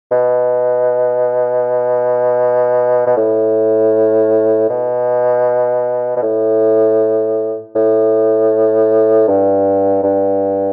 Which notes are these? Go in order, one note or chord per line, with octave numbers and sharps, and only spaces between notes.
B2
B2
A2
B2
B2
A2
A2
G2
G2